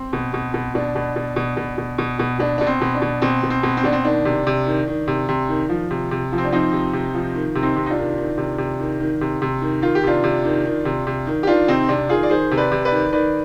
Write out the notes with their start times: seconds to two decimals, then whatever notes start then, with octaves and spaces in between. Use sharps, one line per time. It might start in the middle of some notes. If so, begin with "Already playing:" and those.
Already playing: C4
0.13 B2
0.34 B2
0.54 B2
0.75 B2 D4
0.96 B2
1.16 B2
1.36 B2
1.57 B2
1.78 B2
1.98 B2
2.19 B2
2.39 B2 D4
2.58 B2 D4
2.67 C4
2.81 B2
2.95 D4
3.02 B2
3.22 B2 C4
3.43 B2
3.50 C4
3.63 B2
3.77 C4
3.84 B2 D4
3.92 C4
4.05 D#3 D4
4.25 C3
4.47 C3
4.67 D#3
4.88 D#3
5.08 C3
5.29 C3
5.49 D#3
5.69 F3
5.91 C3
6.11 C3
6.32 F3
6.38 C4
6.45 D4
6.52 F3 C4 D#4
6.73 C3
6.93 C3
7.15 F3
7.35 D#3
7.55 C3
7.63 C4 D#4
7.76 C3
7.86 D#4
7.90 D4 F4
7.97 D#3
8.18 D#3
8.38 C3
8.58 C3
8.80 D#3
9.00 D#3
9.21 C3
9.42 C3
9.62 D#3
9.82 D#3 F4
9.95 G4
10.03 C3 D4 F4
10.24 C3
10.45 D#3
10.66 D#3
10.85 C3
11.07 C3
11.27 D#3
11.43 G4
11.47 D#3 D4 F4
11.68 C3 C4 D#4
11.89 C3 D4
12.09 D#3 F4 G#4
12.23 D5
12.30 D#3 G#4 C5
12.51 C3
12.57 B4 D5
12.72 C3
12.85 B4 D5
12.92 D#3
13.12 D#3 B4 D5